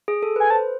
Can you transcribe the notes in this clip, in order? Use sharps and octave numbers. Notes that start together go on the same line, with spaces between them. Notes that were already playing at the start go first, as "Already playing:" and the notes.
G#4
A4
B4 G#5
C5 A5